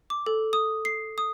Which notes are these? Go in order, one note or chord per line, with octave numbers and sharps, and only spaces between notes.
D6
A4
D#6
C7
D#6